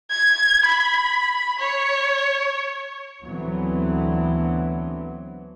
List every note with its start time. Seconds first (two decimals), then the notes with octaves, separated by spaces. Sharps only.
0.10 G#6
0.65 B5
1.59 C#5
3.25 D2 D3 E3 F#3 B3 C4